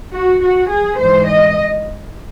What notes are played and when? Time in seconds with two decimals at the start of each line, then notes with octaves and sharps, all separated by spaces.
0.10 F#4
0.40 F#4
0.68 G#4
0.97 G#2 E3 C5
1.26 D#5